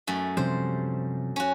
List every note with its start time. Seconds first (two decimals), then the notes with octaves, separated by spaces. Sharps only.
0.07 F#2 A3
0.37 C3 F3 G3 C5
1.36 C#4 F#4